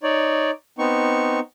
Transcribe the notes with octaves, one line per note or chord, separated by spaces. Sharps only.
D#4 C#5 D5
B3 C4 D#4 C#6